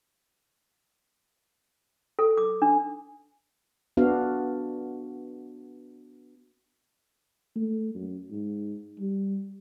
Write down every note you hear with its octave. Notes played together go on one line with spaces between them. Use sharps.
A4
D6
D4
B3 D4 F#4 F5
A3
F#2
G#2
G3